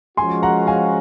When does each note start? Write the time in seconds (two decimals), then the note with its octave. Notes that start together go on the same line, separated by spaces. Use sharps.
0.17 F3 G#3 C#4 F#4 G#5 C6
0.43 F#5 A#5
0.67 F5 G#5